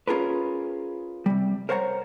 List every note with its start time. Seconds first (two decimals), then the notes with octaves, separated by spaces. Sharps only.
0.07 C#4 F4 G#4 A#4 B4
1.26 C3 G3
1.69 A#4 C5 C#5 F#5 A5 A#5